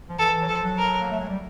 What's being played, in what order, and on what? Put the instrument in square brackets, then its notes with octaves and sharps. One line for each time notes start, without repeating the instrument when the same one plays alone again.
[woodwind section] F3
[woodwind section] E3 [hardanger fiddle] A4
[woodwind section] E3
F#3
[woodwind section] F3 [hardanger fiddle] A4
[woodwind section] F#3
[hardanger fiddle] A#4
[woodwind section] A#3
A3
G#3
G3